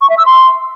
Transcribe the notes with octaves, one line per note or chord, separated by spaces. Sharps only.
C#6
E5
E6
C6